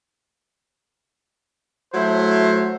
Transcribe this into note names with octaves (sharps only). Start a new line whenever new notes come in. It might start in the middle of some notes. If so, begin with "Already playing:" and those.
F#3 A3 E4 C5